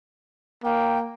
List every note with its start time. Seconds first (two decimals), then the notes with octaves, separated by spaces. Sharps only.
0.64 A#3 G5